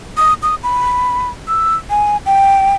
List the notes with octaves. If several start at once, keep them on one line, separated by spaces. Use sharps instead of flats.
D#6
D#6
B5
E6
G#5
G5